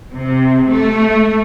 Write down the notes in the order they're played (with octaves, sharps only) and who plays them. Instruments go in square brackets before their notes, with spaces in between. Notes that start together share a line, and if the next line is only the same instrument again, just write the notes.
[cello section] C3
A3